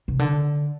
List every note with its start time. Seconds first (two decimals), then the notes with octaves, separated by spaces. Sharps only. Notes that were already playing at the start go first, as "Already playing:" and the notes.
0.08 C3
0.19 D3